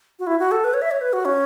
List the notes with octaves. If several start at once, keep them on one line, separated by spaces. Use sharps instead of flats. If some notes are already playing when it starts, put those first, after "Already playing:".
F#4
E4
F#4
A4
B4
C#5
E5
C#5
B4
F#4
C#4